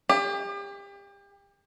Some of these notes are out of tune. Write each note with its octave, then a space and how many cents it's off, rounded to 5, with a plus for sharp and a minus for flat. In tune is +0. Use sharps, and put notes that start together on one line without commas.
G4 +35